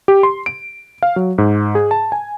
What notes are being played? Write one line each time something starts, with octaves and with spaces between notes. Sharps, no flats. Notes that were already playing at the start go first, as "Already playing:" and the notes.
G4
C6
D7
F5
F#3
G#2
G#4
A5
G#5